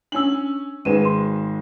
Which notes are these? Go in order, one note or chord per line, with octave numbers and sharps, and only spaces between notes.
C#4 D4 E6 F#7
G#1 G#3 D#4 B4 D#7 E7
C6